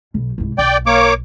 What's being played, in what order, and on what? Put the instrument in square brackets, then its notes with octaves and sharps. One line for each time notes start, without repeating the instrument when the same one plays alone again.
[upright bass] B1
C2 G#2
[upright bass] B1 [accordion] D5 G5
[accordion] A#3 C#5 D6